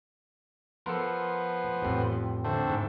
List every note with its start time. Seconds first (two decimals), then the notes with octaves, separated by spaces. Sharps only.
0.86 F3 B3 A4 A#4 C6
1.82 A1 F2
2.44 D3 A3 C4
2.70 G#2